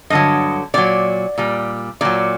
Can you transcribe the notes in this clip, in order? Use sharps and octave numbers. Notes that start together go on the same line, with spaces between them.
G2 D3 F#3 D#5
A#2 F#3 D5
A#2 G3
A#2 F#3 D5